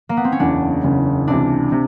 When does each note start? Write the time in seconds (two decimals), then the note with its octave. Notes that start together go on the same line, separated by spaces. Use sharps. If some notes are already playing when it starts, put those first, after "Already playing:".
0.09 A#3
0.17 B3
0.24 C4
0.32 C#4
0.40 F#1 E2 C#3 D4
0.84 F#1 E2 C#3
1.28 C#2 C3 E3 D4
1.72 C3